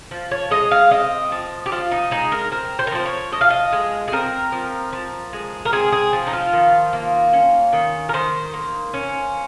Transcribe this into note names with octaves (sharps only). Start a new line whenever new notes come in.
F3
C#5
G#3 D#5
F5
C4 D#5
F3
G4
F3 F4
D#4
G#3 D#4
A#4
C4 A#4
C5
A#4
F3 C5
C#5
F3 D#5
F5
D#5
G#3
G#4
C4 A#4
F3
F3
G#3
A#4
C4 G#4
G#4
F3
D#4
F4
D#3
A#3
C#4
D#3
A#4
D#3 C5
A#3
C#4